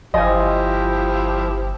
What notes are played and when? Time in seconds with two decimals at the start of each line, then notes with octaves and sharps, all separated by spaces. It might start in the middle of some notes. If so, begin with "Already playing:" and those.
0.14 G1 F3 E4 G4 D#5 G#5